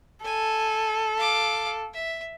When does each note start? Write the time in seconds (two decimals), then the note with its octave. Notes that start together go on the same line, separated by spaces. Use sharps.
0.25 A4 G#5
1.17 F5 D6
1.93 E5